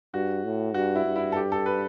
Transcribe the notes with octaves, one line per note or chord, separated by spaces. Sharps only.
G2 F#4
A2
G2 F#4
E4
G2
E4
A4
G4
A4
B4